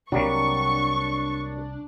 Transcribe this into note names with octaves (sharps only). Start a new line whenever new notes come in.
C2 C3 F#3 G3 A#3 D4 C#6